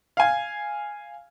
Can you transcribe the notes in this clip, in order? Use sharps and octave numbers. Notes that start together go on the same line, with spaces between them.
F5 G#5